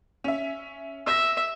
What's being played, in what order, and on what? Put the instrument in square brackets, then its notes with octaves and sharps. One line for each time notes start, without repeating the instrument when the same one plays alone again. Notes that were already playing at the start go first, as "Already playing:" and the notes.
[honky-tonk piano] C#4 E5
[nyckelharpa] E5 [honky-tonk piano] E6 A#6